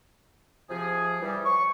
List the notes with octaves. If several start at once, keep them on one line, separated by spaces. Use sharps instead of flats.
C3 F3 G#4
E3 G3
C#6